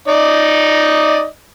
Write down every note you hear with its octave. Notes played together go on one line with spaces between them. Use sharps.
D#4 D5 D#5